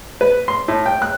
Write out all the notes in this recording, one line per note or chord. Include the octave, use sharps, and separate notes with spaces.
B4
C6
A2
G5
F#6